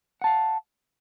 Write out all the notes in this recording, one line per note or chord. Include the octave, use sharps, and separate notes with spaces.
F5 F#5 A5